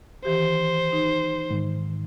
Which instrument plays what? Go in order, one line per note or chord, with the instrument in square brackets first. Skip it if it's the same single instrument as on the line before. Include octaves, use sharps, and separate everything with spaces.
[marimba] D#3 E3 G4 [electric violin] C5
[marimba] D#4
[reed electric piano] G#2 D#3